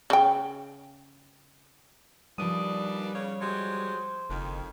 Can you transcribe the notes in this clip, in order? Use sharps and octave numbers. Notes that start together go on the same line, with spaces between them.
C#3 G5
D#2 F3 G3 D4 B4 D#6
C#3 A#3 C#5
F#3 G#3 G4 C5 F5 D6
F#1 F2 D#3